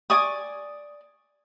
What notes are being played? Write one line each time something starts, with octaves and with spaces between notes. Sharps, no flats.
D5 G#5 C#6 D#6